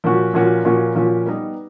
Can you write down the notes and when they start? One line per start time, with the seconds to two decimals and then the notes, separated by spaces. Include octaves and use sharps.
0.04 A#2 F3 A#3 C#4 F#4
0.34 A#2 F3 A#3 C#4 F#4
0.64 A#2 F3 A#3 C#4 F#4
0.95 A#2 F3 A#3 C#4 F#4
1.26 G3 B3 D#4